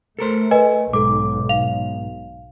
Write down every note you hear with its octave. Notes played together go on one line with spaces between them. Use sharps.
A3 A4 A#4 C5
B4 D#5 G#5
B1 G#2 A4 D6
F5 F7